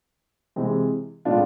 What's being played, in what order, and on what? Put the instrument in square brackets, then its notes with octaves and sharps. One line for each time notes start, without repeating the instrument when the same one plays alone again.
[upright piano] C3 E3 G#3 C4 G#4
A2 G#3 D4 F4